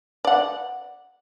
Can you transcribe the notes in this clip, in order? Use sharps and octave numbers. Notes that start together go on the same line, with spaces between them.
D5 F#5